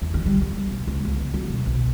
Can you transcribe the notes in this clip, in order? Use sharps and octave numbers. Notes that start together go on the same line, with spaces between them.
E2
D#3
G3
D3
G3
B1
C#2
B3
C#2
F#3
B2
B1